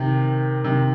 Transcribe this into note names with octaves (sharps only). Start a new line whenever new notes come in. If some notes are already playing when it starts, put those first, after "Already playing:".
Already playing: C3 D#3
C3 D#3